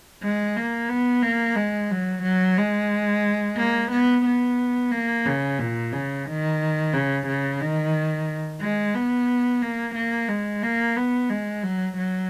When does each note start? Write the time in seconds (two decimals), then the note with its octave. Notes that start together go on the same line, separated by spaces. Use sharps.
0.23 G#3
0.56 A#3
0.89 B3
1.22 A#3
1.56 G#3
1.91 F#3
2.23 F#3
2.58 G#3
3.57 A#3
3.92 B3
4.25 B3
4.92 A#3
5.26 C#3
5.59 A#2
5.93 C#3
6.26 D#3
6.93 C#3
7.28 C#3
7.61 D#3
8.61 G#3
8.95 B3
9.62 A#3
9.95 A#3
10.28 G#3
10.63 A#3
10.96 B3
11.29 G#3
11.63 F#3
11.97 F#3